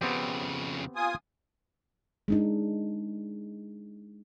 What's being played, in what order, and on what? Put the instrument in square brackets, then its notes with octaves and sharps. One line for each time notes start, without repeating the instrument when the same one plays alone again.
[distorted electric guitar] F2 C#3 [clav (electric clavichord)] B3 C4 G4
[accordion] F4 G#5 D#6
[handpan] G#3 D4 D#4